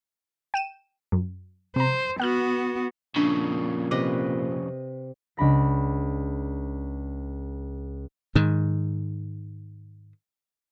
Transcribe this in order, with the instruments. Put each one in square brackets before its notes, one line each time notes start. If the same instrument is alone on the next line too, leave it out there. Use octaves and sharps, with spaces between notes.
[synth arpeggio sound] G5 D#7 E7
F#2
[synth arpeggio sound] C3 A#5 [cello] C5
[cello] B3 F#4 [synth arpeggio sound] F#5 F6 F#6
[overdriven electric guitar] F2 C#3 [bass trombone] A#2 [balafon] D4
[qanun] C3 B4 D#5 [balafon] D6
[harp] C#2 D4 B5 A#6
[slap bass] G#2 D#3